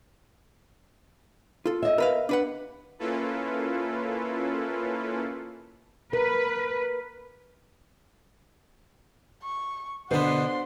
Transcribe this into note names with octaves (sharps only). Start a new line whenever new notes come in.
F4 A4
D#5 E5
A#4 B4 F5
D4 B4 F#5
A#3 C#4 E4 F4 A4 B4
A#4 B4
C#6
B2 D3 B3 D4 C5 F#5 C6